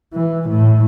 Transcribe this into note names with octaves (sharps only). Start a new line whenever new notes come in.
E3
A2